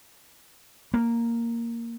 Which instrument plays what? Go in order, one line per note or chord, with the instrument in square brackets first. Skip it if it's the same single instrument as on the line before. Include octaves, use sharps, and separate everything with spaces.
[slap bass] A#3